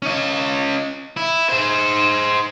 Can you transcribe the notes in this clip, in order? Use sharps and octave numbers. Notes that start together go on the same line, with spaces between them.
C#4 D#5
E4
G#4 C5